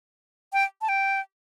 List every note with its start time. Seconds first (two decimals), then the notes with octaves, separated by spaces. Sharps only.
0.53 G5
0.81 A5
0.88 G5